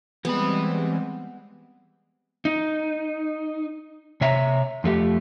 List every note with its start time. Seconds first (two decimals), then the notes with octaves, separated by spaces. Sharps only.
0.25 E3 G3 G#3 B3 C4 B5
2.45 D#4
4.21 C3 C#5 E5 A#5
4.84 F2 A3 G4